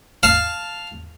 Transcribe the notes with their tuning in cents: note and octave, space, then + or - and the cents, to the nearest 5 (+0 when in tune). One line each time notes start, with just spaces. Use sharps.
F5 +0 A5 +0